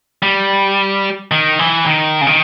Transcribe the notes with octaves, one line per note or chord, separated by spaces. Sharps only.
G3
D#3
E3
D#3
C#3
D#3